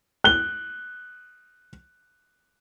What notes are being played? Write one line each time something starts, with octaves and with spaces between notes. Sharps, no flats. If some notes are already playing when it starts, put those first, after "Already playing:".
F#6 G7